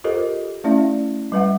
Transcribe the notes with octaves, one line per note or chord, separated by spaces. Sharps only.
F4 G4 A4 A#4 C5 D#5
A3 C#4 E4 D5 E5
G3 B4 E5 F#5